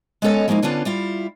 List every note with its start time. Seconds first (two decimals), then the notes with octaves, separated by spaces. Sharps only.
0.22 G#3 B3 C#4 A4 C#5 D#5
0.48 F3 G#3 A#3 D#4 E4
0.62 D3 B3 C#4 D4 F4
0.85 G3 E4 F4